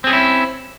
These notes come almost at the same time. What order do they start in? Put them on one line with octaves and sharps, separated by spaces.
C4 G#4 C#4 E4